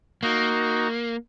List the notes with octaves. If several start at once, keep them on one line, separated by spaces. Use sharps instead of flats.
A#3 D#4 F#4